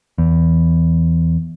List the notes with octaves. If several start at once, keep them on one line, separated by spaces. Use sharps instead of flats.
E2